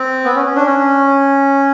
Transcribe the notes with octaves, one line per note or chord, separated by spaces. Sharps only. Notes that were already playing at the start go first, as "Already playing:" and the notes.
Already playing: C4
B3
C#4
C#4
D4
C#4